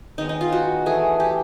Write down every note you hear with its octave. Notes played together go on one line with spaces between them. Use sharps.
D#3 G#3 B3 D#4
D#4
F4
F#4
E3 A3 G#4
G4